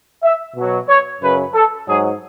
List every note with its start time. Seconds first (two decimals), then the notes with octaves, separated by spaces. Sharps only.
0.22 E5
0.55 B2 F#3
0.87 C#5
1.20 F#2 C#3 F#3 B4
1.53 A4
1.87 G#2 F#3 G#4